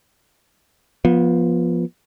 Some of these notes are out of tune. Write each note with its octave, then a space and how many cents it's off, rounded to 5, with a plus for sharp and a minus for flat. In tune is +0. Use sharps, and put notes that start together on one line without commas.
F3 +0 B3 -25